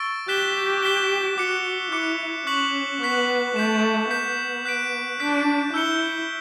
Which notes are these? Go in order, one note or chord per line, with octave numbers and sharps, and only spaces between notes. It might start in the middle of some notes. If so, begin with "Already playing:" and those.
Already playing: C#6 E6 A6 D7
G4 F#6 B6 E7 G7
F#6 B6 E7 G7
F#4 D6 F#6 C#7
E4 D6 F#6 C#7
C#4 C#6 F#6 B6 F#7
B3 C#6 F#6 B6 F#7
A3 G6 B6 E7
B3 G6 B6 E7
F#6 B6 D7
D4 F#6 B6 D7
E4 E6 G6 C#7 G7